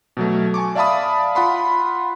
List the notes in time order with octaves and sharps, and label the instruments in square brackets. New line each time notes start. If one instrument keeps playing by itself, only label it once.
[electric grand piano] B2 F#3 A3
G#5 A5 C#6 D6
D5 E5 F5 A5 B5 D#6
F4 F#5 B5 C6